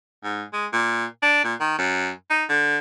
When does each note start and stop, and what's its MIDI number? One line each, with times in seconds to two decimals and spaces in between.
0.24 0.44 44
0.53 0.66 56
0.73 1.05 46
1.22 1.40 62
1.44 1.54 46
1.60 1.78 51
1.78 2.10 42
2.30 2.44 63
2.49 2.78 50